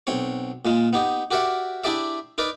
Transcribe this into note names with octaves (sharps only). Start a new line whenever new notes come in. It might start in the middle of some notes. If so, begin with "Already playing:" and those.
B1 C4 C#5
A#2 G#3 F4
B3 D#4 G4
F#4 G4 A#4 D5 E5 F#5
D4 E4 G4 G#4 D5 E5
D#4 A#4 B4 D5